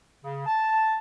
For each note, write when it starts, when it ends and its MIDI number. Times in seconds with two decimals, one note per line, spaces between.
0.24 0.45 49
0.46 0.97 81